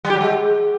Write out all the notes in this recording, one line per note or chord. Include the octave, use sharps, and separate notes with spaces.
G3
G4
F#3
G#3